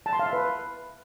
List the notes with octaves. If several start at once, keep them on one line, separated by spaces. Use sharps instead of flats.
A5
C6
F5
E5
B4